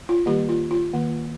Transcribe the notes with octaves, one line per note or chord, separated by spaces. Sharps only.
F4
D#3 G3 A#3 G4
F4
F4
D#3 A#3